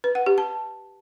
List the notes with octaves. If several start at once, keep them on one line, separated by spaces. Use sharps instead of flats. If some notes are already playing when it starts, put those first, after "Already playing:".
B4
F#5
G4
A5